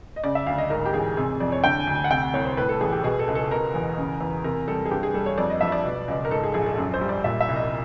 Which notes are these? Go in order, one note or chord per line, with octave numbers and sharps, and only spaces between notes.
D#5
C#3 D5
E5
D2 F5
D#5
G#2 A#4
G4
A1 G#4
C3 G#4
F2 D5
C#5
D3 G5
G#5
D2
G#5
F#5
C3 G5
F#5
C2 C#5
C5
A2 B4
A4
A1 G#4
G4
B2 G#4
A4
C#2
A4
B2 A#4
E2
C#3
E2
C3 A#4
G3 A4
G#4
G2 G4
G#4
G3 A4
C#5
F2 D5
D#5
F3 E5
D5
B2
C#2
A#4
G#2 A4
G#4
A#1 G#4
A4
F#2
C5
G3
D5
A#2 E5
E5
C2
D#5